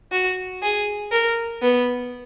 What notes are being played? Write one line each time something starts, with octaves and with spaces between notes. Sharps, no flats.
F#4
G#4
A#4
B3